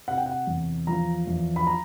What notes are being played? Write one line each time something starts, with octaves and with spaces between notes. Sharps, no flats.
C3 F#5
G5
F#5
E2
F3 A#5
E2
B5
A#5